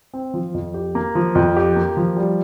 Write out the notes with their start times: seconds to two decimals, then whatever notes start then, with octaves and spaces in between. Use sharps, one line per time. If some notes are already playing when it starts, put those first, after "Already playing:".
0.14 C4
0.34 F3
0.54 F2
0.74 G4
0.95 A#3
1.15 F3
1.35 F2
1.57 G4
1.76 A#3
1.97 F3
2.17 G3